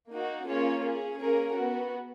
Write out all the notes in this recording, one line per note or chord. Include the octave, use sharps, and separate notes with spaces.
A#3 D#4 F#4
A#3 C#4 F4 G#4 C#5
C#4 G#4
A#3 C#4 G#4 A#4
B3 F#4